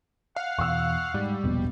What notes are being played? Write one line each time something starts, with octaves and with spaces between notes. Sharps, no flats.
F5 F#5
E2 B2 C#6 E6
G#2 G3
E1 A#1 B2